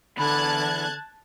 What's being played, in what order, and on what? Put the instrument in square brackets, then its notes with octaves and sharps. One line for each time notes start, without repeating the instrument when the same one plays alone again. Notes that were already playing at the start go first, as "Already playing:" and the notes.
[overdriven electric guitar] E2 B5 [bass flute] D3 [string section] A5 F#6 G#6